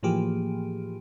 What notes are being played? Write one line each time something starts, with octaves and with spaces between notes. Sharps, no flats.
A2 E3 F3 A#3 G4 G#4